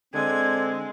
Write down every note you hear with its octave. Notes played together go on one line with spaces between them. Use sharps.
D3 G#3 C4 G#6